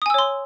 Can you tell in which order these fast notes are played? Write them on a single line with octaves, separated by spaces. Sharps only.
D#6 G#5 E6 C#5 C6